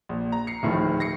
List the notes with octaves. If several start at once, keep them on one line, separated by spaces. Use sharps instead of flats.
A#1
A#5
C7 C#7
D1 A2 D#3 F3
A#6 C7 C#7